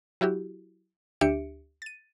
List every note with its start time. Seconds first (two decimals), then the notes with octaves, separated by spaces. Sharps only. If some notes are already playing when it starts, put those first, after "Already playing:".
0.21 F#3 E4 F#4 G4
1.21 D2 D4 G4 E5 C#7 D7
1.82 A6 D#7